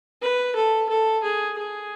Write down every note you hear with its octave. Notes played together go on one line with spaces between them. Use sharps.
B4
A4
A4
G#4
G#4